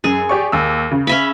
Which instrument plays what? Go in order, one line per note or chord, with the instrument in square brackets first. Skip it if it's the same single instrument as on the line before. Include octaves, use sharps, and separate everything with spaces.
[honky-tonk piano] F#2 [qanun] G#4
[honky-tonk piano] G4 D5 C#6
D#2 E6
C#3
[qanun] C#4 E5 B5